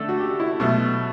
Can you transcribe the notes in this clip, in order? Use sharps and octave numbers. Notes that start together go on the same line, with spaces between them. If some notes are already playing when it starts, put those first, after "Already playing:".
Already playing: D3 A3 A4
F#4
G4
E4
B2 F#3 A3